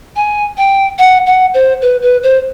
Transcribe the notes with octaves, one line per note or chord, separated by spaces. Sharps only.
G#5
G5
F#5
F#5
C5
B4
B4
C5